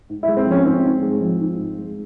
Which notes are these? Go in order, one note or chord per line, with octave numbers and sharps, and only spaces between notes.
G#2
E4
G#3
C4
F3 C#4
G#2 C4
G#2
G#3
F3
G#2
G#2
G#3